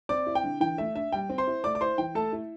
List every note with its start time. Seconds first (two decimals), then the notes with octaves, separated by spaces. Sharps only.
0.09 C4 D5 D6
0.26 E4
0.35 G5
0.44 D3
0.60 E3 G5
0.78 A3 E5
0.95 D4 E5
1.12 G3 G5
1.29 C4
1.38 C5 C6
1.47 E4
1.64 A3 D5 D6
1.75 D6
1.81 E4 C5 C6
1.98 E3 G5
2.15 A3 A4 A5
2.32 E4